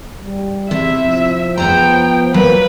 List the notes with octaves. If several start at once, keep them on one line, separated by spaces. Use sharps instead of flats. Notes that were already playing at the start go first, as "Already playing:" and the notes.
G3
C3 E4 E5
F3
B3 C5 G5 A#5
F#3 A#3 B4